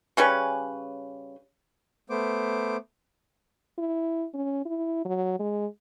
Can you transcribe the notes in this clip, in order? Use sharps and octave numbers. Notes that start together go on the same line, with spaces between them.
C#3 G3 C#4 B4
A3 B3 C5 D6
E4
C#4
E4
F#3
G#3